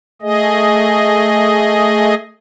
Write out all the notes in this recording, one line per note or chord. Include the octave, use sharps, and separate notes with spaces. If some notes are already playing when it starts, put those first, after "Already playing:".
A3 G#4 D#5